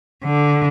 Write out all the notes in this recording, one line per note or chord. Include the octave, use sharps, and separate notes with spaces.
D3